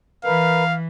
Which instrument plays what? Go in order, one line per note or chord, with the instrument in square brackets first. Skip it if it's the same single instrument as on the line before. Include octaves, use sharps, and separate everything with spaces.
[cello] E3 [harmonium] A#4 B4 [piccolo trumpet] F5